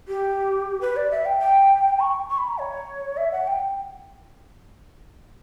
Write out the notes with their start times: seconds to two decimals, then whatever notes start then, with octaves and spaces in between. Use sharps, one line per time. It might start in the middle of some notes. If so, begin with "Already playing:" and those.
0.08 G4
0.81 B4
0.96 D5
1.11 E5
1.25 G5
1.40 G5
2.00 C#6
2.29 C#6
2.38 B5
2.48 A#5
2.58 C#5
3.17 E5
3.32 F#5
3.47 G5